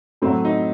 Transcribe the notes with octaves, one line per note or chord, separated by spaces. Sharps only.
A2 F#3 C4
D#4